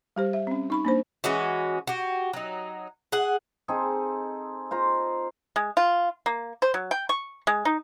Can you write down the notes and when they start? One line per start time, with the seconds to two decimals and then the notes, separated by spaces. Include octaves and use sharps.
0.16 G3 G4 C5
0.33 E5
0.47 C4 C#4
0.70 D#4 B5 C#6
0.85 A#3 D4 C5
1.24 E3 G#3 C#4 F#4
1.87 F#4 G4
2.33 F#3 D#4
3.12 G#4 F#5
3.68 C4 D#4 G#4 A4
4.71 F4 C5 A#5
5.56 G#3
5.77 F4
6.26 A#3
6.62 C5
6.74 F#3
6.91 G5
7.09 C#6
7.47 G#3
7.65 D#4